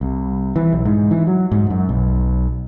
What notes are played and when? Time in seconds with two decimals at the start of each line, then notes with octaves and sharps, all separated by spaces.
0.01 C2
0.56 E3
0.73 B1
0.85 G#2
1.11 E3
1.27 F#3
1.52 G#2
1.70 F#2
1.89 B1